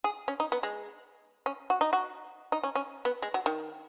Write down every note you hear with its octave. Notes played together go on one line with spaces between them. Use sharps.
G#4
C#4
D#4
B3
G#3
C#4
F#4
D#4
F#4
D#4
C#4
C#4
B3
G#3
F#3
D#3